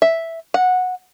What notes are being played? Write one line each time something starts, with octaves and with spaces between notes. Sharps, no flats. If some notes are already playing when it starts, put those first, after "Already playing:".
E5
F#5